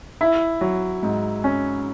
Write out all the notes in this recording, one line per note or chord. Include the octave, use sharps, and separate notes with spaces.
E4
F#3
G#2
C#4